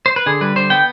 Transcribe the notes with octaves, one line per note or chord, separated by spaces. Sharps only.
C5
B4
D3 G#4
G3 B4
D3 C5
B3 G5